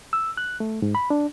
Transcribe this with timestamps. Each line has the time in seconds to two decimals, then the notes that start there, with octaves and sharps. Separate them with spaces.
0.13 E6
0.37 F#6
0.60 A3
0.82 G#2
0.95 B5
1.10 D4